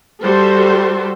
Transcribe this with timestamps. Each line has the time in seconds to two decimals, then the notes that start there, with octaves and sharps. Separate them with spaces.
0.23 G3 F#4 A4 C5